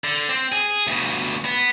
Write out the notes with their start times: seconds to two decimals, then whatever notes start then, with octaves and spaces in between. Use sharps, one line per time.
0.04 D3
0.29 C4
0.52 G#4
0.87 D2 B2
1.45 B3